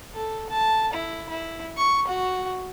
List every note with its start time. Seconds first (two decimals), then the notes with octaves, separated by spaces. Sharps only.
0.14 A4
0.50 A5
0.93 E4
1.29 E4
1.77 C#6
2.07 F#4